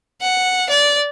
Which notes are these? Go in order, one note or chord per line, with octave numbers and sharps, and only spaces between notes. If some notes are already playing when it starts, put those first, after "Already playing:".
F#5
D5